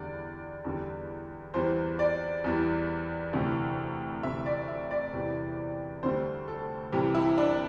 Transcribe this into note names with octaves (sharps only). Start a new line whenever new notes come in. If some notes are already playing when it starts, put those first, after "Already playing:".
Already playing: E2 D3 G3 D5
E2 D3 G3
E2 E3 G3 C5
D5
E2 E3 G3
D2 C3 E3
D2 C3 E3 E5
D5
E5
D5
E2 C3 E3 G3
D2 D3 G3 C5
A4
C2 C3 E3 G3 G4
E4
D4